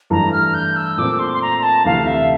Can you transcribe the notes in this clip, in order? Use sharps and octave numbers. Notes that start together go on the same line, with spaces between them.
G2 E3 A3 A#5
F6
G6
E6
A#2 A3 C4 D6
C6
C6
A#5
A5
D2 C3 E3 A3 F5
E5